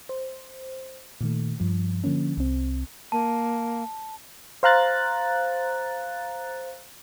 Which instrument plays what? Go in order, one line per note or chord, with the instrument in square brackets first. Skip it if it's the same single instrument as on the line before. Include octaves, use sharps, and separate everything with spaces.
[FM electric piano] C5
A#2 D#3 A3
G2 F3
D3 F3 A#3 C#4
C2 C4
[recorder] A#3 [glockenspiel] A5
[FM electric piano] C5 F5 A#5 F#6 A6